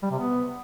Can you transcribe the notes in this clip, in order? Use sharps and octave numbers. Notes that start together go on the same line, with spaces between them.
G3
C3
B3